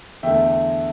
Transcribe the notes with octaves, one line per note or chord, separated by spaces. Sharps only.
E2 D3 A3 E5 G5